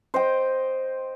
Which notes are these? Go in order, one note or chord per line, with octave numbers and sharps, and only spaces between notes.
C5 D#5 G5